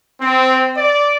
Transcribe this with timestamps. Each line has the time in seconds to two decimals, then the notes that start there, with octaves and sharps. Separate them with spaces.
0.20 C4
0.77 D5